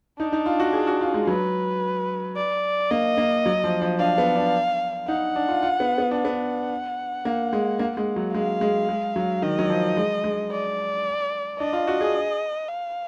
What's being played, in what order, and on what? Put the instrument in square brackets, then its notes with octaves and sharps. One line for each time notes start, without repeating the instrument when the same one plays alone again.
[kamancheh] D4 [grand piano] D#4
[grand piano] D#4
F4
F#4
G#4
F#4
F4
G#3
[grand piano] F#3 [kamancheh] B4
[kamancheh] D5
[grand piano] A#3 [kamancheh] D#5
[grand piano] A#3
F#3
F3
F3
[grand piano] D4 [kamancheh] F5
[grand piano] B3
D4
[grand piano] D#4 [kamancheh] F#5
[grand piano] D4
F4
F4
B3
B3
D4
[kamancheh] F#5
[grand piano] B3
A#3
G#3
A#3
G#3
F#3
[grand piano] G#3 [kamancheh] F5
[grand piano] G#3
G#3
F#3
[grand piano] D#3 [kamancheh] D#5
[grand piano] F#3
F3
G#3
G#3
[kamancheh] D5
[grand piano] D4 [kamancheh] D#5
[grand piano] F4
F#4
G#4
[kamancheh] F5